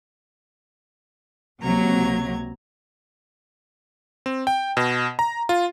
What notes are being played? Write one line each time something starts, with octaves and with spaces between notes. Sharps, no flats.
C#2 C3 F#3 A#3 A#5 G#6
C4
G5
B2
A#5
F4